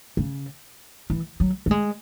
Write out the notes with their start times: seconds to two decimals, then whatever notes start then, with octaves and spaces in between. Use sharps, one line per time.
0.17 C#3
1.10 E3
1.40 F#3
1.66 A3
1.71 G#3